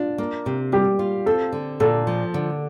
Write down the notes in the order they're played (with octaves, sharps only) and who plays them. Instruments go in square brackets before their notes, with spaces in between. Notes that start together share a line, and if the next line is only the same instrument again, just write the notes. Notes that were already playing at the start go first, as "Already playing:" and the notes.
Already playing: [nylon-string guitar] D4 [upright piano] F4
[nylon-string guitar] A#3
C3
[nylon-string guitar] G3 [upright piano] G4
[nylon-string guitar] F4
[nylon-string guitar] C4 [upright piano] A4
[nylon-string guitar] D3
[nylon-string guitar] A#2 [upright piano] A4
[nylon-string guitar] F3
D3